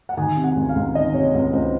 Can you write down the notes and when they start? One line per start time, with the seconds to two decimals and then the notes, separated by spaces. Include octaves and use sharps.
0.09 F#5
0.17 D#3 G#5
0.36 C3
0.44 F#5
0.56 C#2
0.69 F5
0.76 C#2
0.95 D#3 D#5
1.14 C3 C#5
1.34 C#2
1.53 C#2 C5